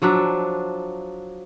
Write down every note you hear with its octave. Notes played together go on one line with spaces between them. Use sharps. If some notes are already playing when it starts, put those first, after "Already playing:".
F3 F#3 D4 E5